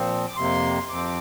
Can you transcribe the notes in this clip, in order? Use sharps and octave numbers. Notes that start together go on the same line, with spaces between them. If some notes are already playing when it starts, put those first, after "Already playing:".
Already playing: A#2 F3 C4
D6
F2 C3 A#3 C6
F2 F3 C4 D6